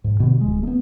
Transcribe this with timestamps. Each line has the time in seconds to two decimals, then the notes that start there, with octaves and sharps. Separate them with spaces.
0.04 G#2
0.20 B2 D3
0.41 D1 G#3
0.63 A3 B3